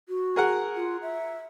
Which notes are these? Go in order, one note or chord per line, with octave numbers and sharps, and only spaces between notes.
F#4
G#4 A#4 F#5
F4
E5